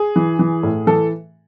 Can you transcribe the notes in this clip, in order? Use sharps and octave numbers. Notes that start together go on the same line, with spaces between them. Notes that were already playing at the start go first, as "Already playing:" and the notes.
Already playing: G#4
E3
E3
A2
E3 A4